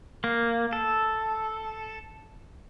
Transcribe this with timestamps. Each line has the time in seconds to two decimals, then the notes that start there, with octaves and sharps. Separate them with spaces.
0.24 A#3
0.73 A4